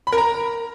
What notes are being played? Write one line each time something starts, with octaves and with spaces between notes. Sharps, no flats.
B5
A#4
A#5